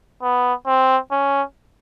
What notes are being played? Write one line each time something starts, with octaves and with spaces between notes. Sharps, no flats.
B3
C4
C#4